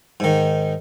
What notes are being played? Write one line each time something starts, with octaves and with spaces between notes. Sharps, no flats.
G#2 D#3